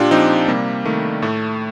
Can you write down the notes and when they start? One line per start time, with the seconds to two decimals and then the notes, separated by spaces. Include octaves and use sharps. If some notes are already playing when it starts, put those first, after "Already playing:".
Already playing: A#2 D4 F4 G4
0.11 F3 C4 D#4
0.48 C3 G3 A#3
0.85 D#3 A3
1.22 A2 A3